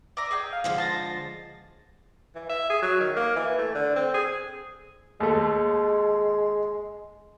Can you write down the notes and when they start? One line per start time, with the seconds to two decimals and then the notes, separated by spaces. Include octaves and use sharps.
0.17 D5 E5 A#5
0.31 G#4 D#5 G5
0.53 F5
0.64 D3 F3 G#3
0.78 C5 A5 A6 A#6
2.35 E3
2.49 E5
2.70 G#4
2.82 F#3
3.00 D#3
3.16 A#3
3.36 E3
3.58 A3
3.75 D3
3.96 C4
4.14 G#4
5.20 D#2 G#3 A3